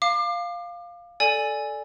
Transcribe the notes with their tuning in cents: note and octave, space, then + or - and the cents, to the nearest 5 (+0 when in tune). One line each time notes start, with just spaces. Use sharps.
F5 +0 D6 +30
A4 +0 D5 +0 G#5 +0